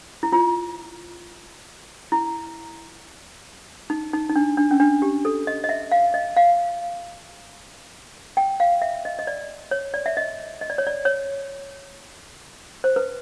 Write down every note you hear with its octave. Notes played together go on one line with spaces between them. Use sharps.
E4
F4
E4
D#4
D#4
D#4
D4
D4
C#4
D4
G4
A4
D#5
D#5
E5
F5
D#5
F5
G5
F5
E5
D#5
D#5
D5
C#5
D5
E5
D#5
D#5
D5
C#5
D5
C#5
C5
B4